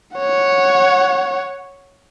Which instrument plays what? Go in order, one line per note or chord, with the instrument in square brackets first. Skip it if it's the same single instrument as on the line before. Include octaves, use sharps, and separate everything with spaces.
[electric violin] C#5 F#5